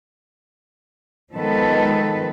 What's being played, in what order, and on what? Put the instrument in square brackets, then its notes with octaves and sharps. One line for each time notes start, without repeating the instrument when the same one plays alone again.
[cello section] D#3 F3 G#3 B3 A4 B4